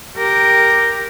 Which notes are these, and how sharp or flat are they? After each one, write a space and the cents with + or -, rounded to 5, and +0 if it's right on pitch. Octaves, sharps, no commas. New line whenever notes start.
G4 +0 A#4 +0